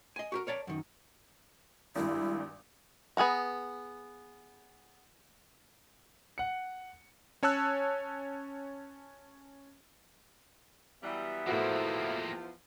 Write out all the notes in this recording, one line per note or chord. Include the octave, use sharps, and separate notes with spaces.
D#5 G#5
F#4 G4 A#4
A#4 C#5 D5 A5
F#2 D#3
G#1 G2 E4
B3 G#4 F#5 A#5
F#5 C#7
C#4 C#5 A5 E6 F#6
E3 F#3 G3 B3 E5
E2 A2 F3 A#3 C4 F#4